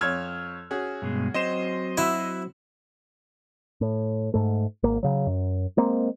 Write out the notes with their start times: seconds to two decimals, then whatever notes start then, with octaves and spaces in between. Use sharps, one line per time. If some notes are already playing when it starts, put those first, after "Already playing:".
0.01 F2 C#5 E6 F6 G#6
0.71 C#4 F#4 G#4
1.02 G2 B2 G#3
1.34 F#3 C4 C5 D#5 C6 E7
1.98 E4 F#4 E5
3.81 A2
4.34 G#2 A3
4.83 G#1 A#3
5.03 C#3 F#3
5.27 F#2
5.77 G#3 A#3 C4